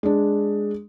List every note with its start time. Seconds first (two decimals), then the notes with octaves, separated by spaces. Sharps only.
0.03 G#3 D4